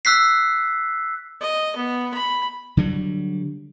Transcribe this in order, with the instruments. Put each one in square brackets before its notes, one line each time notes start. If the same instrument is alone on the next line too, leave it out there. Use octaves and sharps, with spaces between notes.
[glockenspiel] E6 F#6 B6 C7
[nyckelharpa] D#5
B3
B5
[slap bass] D3 F#3 G3